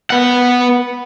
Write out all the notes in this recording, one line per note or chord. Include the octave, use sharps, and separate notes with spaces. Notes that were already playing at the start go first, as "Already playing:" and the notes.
B3 F#5